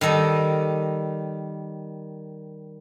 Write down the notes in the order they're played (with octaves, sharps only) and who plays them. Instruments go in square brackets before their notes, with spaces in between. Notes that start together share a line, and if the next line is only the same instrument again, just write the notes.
[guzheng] D#3 G3 A4 D#5